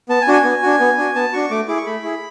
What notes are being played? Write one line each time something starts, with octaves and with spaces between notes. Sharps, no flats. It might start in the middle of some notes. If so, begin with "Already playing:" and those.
B3 A5
G#5
D4 F#4
G#5
B3
D4 F#4
B3
D4 F#4
B3 A5
D4 F#4 C#6
A3 D6
E4 G#4 D6
C#6
A3 B5
E4 G#4